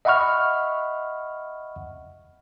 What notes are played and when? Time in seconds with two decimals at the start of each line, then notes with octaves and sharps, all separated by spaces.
0.05 D#5 E5 F#5 B5 C#6 F6